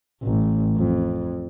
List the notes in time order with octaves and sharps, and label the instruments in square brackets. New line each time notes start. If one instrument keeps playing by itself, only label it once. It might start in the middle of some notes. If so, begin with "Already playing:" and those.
[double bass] A1
F2